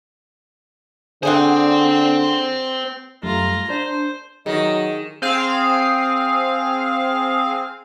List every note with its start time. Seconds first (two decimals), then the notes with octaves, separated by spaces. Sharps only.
1.23 D3 G#4 C5 D5 F#5 G5
3.23 F#2 G3 A3 F4 A#5
3.70 D4 C5
4.46 D#3 F#3 G#4 D#5
5.22 C4 G#4 F5